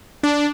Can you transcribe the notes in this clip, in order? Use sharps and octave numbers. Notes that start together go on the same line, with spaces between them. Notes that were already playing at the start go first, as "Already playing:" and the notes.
D4